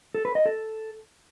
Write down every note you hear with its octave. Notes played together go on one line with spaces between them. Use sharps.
A4
B4
D#5
A4